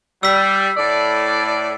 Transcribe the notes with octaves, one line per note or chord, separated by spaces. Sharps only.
G3 E6 B6
A2 D5